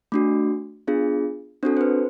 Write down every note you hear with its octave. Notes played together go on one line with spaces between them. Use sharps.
A3 D4 F#4
B3 D4 F4 G#4
C4 D4 F#4 A4 C5
C5
B4